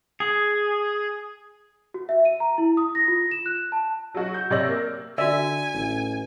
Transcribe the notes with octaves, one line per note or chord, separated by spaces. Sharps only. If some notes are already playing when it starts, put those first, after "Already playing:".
G#4
F#4
E5
D#7
A#5
E4
D#6
A#6
F4
E7
F#6
A5
F#3 F#4
G6
C3 C#5 D5 E6 A#6 F#7
A#3
D3 F#4 D5 E5 G#5
A1